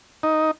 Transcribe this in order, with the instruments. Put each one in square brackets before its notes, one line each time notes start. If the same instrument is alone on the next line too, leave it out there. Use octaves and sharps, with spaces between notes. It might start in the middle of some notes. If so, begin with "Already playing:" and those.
[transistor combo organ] D#4